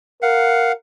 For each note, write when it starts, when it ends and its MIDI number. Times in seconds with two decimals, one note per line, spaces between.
0.22 0.73 70
0.22 0.72 77
0.22 0.72 78